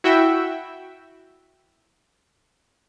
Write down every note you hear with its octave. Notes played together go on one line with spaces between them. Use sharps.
E4 F#4 E5 G5